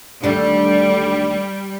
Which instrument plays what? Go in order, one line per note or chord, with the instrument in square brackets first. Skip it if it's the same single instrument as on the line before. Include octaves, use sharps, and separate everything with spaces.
[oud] D#2 A3 D4 [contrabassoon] D3 [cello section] G3